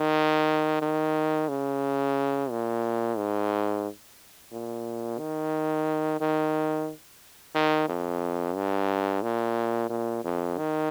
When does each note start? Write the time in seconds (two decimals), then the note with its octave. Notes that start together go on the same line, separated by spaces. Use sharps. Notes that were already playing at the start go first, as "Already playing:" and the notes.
Already playing: D#3
0.82 D#3
1.49 C#3
2.51 A#2
3.17 G#2
4.52 A#2
5.19 D#3
6.21 D#3
7.55 D#3
7.89 F2
8.56 G2
9.22 A#2
9.90 A#2
10.24 F2
10.58 D#3